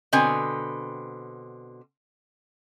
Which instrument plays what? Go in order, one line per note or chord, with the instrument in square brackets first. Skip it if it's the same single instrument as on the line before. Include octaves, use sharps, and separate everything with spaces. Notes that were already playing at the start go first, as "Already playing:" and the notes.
[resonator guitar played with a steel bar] B2 D3 C4 G#5